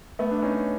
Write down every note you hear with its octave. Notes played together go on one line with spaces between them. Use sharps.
A3 B3
D4
C#4 D#4